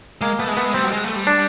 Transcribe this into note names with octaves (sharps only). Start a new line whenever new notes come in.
G#3 A#3
A3 B3
G#3
A3 B3
G#3
G3 C4
F#3
G3
G#3
A3
G3
D4